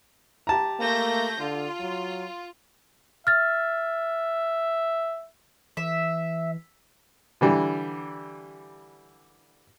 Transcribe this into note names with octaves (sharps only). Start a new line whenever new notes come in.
G4 A5 A#5
A3 A#3 G6 A#6
D3 F4
F#3
E5 F6 A6
E3 E5
D3 E3 G3